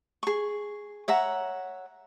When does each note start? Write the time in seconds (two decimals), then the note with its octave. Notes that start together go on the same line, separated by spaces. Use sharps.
0.23 G#4 C#6
1.08 C#5 E5 F#5 A#5